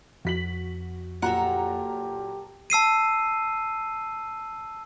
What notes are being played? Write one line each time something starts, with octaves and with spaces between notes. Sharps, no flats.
F2 F#4 B6 F#7
A#2 F#3 G4 A4 A#4 F#5 A#5
A5 E6 C7 D#7